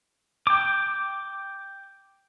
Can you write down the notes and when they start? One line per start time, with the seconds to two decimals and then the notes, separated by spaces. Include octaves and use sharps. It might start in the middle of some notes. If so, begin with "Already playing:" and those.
0.47 G5 D6